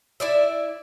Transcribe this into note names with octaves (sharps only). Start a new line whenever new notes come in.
E4 D5 E5